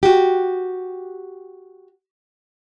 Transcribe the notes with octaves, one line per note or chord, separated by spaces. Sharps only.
F#4 G4